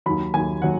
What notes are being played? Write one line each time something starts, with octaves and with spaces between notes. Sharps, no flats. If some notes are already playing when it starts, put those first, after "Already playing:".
D#2 D#3 F#3 B5
D#2 D#3 F#3 G#5
D#3 F#3 F#5